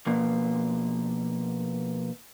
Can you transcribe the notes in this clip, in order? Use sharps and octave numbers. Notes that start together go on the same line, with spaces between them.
B2 F3 A#3